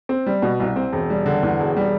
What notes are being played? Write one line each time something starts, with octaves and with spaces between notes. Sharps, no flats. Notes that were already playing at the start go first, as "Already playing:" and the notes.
C4
G3
B2
C2
C4
E1
G3
D3
E2
E1
G3